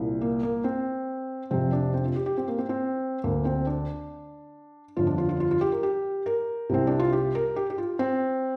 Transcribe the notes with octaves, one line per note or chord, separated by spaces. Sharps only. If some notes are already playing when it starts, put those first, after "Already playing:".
Already playing: C2 A#2
A#3
A#3
C4
F1 F2 C3 C4
D4
C4
F4
G4
G4
C4
A#3
C4
C4
D2 D3 A#3
C4
D4
G1 F2 D3 F4
D4
F4
F4
F4
F4
G4
A#4
G4
A#4
C2 C3 C4
D4
F4
G4
A#4
G4
G4
F4
C4